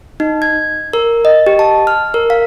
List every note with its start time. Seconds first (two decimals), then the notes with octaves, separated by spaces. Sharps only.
0.20 D#4
0.42 G#6
0.93 A#4
1.25 D#5
1.47 G4
1.59 A5
1.87 F6
2.14 A#4
2.30 F5